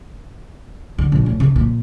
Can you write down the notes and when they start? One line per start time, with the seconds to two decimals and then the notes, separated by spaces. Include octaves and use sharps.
0.98 D3
1.12 A#1
1.26 A2
1.40 C3
1.56 A#2 F3